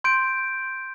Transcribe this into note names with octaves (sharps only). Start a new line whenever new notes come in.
C6 G6 D7